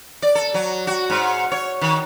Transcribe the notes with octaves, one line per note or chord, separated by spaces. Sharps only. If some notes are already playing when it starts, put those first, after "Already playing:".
D5
A4
F#3
F#4
G#2
C#5
D#3